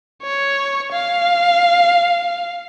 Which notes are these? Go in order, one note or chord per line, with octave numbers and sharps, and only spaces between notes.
C#5
F5